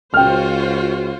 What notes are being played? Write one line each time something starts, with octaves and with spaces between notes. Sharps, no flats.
C#2 F4 F#4 C5 G5 F6